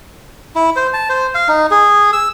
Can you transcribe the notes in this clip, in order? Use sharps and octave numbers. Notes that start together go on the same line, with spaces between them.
E4
C5
A5
C5
F5
D#4
G#4
E6